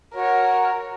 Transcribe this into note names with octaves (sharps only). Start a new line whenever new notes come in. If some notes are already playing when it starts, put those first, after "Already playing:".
F#4 A#4 C#5